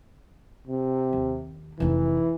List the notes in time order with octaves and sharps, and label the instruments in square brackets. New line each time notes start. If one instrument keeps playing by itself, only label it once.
[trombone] C3
[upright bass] D#2
[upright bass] F1 D#4 [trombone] E3